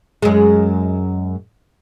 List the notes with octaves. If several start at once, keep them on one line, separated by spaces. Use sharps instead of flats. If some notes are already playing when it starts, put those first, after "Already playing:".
F#2 G#3